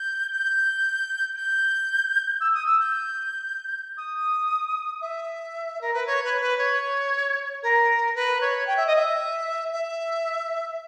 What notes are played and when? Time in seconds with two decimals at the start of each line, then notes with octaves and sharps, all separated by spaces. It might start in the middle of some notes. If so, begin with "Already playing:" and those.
Already playing: G6
0.32 G6
1.36 G6
2.40 E6
2.54 D#6
2.66 E6
2.79 G6
3.97 D#6
5.01 E5
5.81 A#4
5.93 B4
6.06 C#5
6.24 B4
6.41 B4
6.58 C#5
7.62 A#4
8.15 B4
8.40 C#5
8.66 G5
8.76 E5
8.86 D#5
8.95 E5
9.71 E5